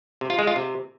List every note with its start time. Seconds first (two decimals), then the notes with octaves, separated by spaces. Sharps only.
0.21 C3
0.30 F4
0.39 G#3
0.47 F4
0.56 C3